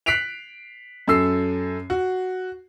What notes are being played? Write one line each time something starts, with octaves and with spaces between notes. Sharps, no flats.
F#6 B6 C7 D7 F7
F#2 A4 E6 C7
F#4